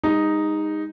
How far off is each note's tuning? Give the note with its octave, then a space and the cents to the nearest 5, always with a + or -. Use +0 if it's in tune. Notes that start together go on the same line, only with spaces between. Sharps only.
G#3 -45 D#4 +0